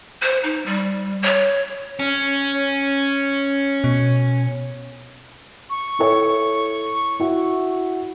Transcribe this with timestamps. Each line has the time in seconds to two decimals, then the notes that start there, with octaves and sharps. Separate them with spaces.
0.22 C5
0.43 D#4
0.66 G3
1.22 C#5
1.99 C#4
3.84 B2
5.70 C#6
5.99 E4 A4 C#5
7.20 E4 F#4